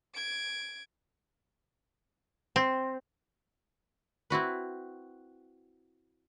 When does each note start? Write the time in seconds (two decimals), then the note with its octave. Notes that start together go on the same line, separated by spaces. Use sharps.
0.15 G#6 D7
2.56 C4
4.30 C4 E4 F#4 B4